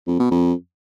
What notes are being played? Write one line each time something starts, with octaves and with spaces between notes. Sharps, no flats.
F2
B2
F2